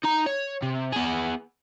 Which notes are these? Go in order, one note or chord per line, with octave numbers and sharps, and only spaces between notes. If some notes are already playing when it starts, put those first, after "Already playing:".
D#4 A#5
C#5
C3
B3 G#4